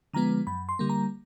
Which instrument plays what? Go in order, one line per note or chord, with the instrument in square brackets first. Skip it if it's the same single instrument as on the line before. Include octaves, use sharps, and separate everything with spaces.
[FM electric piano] D3 F3 G#3 B3 A#5
F#2 B5
C6
D3 G3 A#3
A#5